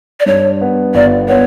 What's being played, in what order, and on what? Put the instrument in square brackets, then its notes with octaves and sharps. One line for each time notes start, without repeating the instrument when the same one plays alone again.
[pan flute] D5
[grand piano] G2 [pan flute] C#5
[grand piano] B3
[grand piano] G1 [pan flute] D5
[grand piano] B3 [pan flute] C#5